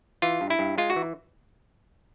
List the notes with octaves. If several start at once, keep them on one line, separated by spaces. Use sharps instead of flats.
E3 F4
G2
E4
G2
G#3 F4
F#4
E3